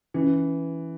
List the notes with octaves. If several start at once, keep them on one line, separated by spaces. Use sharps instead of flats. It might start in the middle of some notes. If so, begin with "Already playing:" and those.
E3 C#4